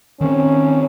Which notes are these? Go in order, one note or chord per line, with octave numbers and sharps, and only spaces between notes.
D#3 C4 C#4